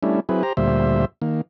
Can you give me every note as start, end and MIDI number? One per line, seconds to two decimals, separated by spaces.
0.03 0.20 55
0.03 0.20 57
0.03 0.20 61
0.03 0.20 62
0.03 0.20 64
0.29 0.43 54
0.29 0.43 60
0.29 0.43 64
0.29 0.43 68
0.29 0.43 71
0.43 0.53 67
0.43 0.53 72
0.43 0.53 82
0.57 1.05 38
0.57 1.05 46
0.57 1.05 55
0.57 1.05 72
0.57 1.05 76
1.22 1.41 51
1.22 1.41 58